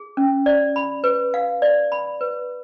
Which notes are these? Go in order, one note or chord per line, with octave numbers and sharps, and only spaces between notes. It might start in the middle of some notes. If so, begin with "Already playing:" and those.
Already playing: G#4
C#4
D5
B5
B4
F5
D5
B5
B4